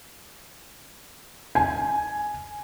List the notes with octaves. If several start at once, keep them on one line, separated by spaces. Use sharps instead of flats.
G#5